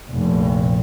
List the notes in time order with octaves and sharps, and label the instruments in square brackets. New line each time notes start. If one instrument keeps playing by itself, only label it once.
[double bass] F1 A#1